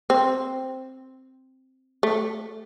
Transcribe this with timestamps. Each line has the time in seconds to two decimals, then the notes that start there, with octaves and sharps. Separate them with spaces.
0.10 C4
2.03 A3